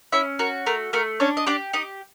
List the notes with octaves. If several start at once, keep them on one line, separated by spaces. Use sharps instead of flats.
C#4 E4 E5
F#4 A#4
A3 A#4
A3 A#4
C#4 D4 C#5
D#5
D4 G4 D5
D#4 G4 D#5